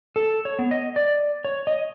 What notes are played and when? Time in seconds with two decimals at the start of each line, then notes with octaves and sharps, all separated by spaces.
0.16 A4
0.45 C#5
0.59 B3
0.71 D#5
0.96 D5
1.45 C#5
1.67 D#5